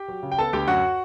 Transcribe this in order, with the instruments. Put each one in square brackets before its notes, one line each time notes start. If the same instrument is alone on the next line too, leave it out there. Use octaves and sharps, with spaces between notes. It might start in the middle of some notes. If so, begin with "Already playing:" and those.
Already playing: [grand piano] G4 G5
F#3
C#3
G5
B3 A4 A5
D2 G4 G5
F#2 F#4 F#5